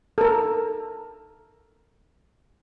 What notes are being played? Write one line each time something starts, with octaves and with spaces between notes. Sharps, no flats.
A4 A#4